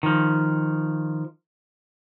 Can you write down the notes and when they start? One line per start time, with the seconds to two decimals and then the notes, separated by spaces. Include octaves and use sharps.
0.03 D#3 F3